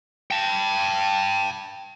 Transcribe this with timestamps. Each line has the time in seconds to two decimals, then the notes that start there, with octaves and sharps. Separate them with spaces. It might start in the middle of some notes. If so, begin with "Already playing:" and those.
0.31 G5 A5